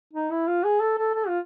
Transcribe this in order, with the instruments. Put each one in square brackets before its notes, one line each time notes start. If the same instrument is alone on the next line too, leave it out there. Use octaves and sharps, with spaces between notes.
[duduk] D#4
E4
F4
G#4
A4
A4
A4
F4